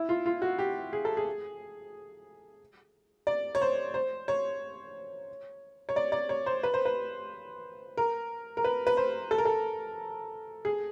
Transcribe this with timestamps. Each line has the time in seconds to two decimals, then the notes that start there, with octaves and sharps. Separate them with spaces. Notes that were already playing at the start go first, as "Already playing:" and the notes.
Already playing: E4
0.09 F4
0.26 F4
0.42 F#4
0.59 G4
0.93 G#4
1.05 A4
1.17 G#4
3.27 D5
3.55 C#5
3.62 C5
3.94 C5
4.28 C#5
5.89 C#5
5.96 D5
6.12 D5
6.29 C#5
6.46 C5
6.63 B4
6.74 C5
6.85 B4
7.97 A#4
8.57 A#4
8.64 B4
8.87 B4
8.97 C5
9.31 A4
9.38 A#4
9.45 A4
10.65 G#4